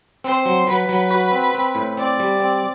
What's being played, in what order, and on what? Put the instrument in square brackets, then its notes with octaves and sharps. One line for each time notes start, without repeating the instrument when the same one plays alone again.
[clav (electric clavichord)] C4 [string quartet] C5
[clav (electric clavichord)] F#3
[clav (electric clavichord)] F#3 [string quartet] B4
[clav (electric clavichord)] F#3
F#4
C4
C4
A2
[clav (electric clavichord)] C4 [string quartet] D5
[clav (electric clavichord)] G3
C4